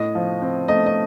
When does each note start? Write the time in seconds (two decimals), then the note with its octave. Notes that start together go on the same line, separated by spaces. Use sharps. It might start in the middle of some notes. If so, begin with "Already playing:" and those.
Already playing: A2 D#5
0.15 F3
0.42 C4
0.68 A3 D#5
0.86 D#5